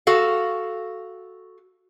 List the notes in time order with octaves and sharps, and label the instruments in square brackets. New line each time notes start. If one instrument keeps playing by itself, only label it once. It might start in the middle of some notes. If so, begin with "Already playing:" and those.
[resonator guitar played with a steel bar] F#4 A4 F5